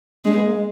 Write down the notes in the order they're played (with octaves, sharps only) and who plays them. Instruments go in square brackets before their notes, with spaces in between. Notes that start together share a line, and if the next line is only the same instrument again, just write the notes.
[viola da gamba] G#3 [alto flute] D4
[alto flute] B3
A#3
G#3